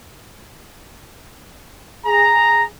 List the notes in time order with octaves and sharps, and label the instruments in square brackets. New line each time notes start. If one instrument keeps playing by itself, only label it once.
[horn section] G#4 A#5